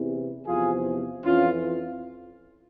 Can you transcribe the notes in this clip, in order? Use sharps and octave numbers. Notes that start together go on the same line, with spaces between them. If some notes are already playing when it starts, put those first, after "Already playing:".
Already playing: E2 C3 E3
E2 C3 F3 F4 G#4
F2 E3 C#4 F4